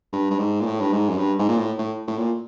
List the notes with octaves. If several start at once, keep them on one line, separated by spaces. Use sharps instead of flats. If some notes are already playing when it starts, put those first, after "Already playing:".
G2
G2
G#2
A#2
A2
G2
G#2
F#2
G2
G#2
A#2
A2
A2
A2
A#2